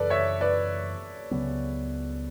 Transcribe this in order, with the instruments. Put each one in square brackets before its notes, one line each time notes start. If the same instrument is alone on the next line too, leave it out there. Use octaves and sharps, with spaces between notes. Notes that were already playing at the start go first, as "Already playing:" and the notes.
Already playing: [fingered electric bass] F#2 C#3 E3 [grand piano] A4 B4 D5
[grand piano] C#5 E5
B4 D5
[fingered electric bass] C#2 C#3 F#3 B3